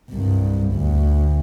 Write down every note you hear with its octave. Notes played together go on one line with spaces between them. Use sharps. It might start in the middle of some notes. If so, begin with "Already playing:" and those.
C2 G2
D2